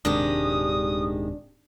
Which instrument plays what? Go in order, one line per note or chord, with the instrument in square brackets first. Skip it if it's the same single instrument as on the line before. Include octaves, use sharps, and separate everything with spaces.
[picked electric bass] D#1 G#2 C3 [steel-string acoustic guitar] D#3 G#3 G4 [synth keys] D4 [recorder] D#6